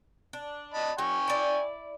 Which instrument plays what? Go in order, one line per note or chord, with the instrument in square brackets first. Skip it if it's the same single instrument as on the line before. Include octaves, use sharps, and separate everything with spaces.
[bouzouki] D4
[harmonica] D#5 A5 B5
[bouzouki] F#3 [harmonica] G5 G#5 C#6
[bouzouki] E4 D5